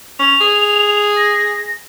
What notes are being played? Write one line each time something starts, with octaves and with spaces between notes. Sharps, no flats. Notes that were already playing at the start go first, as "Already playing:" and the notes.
C#4 F7
G#4
A#6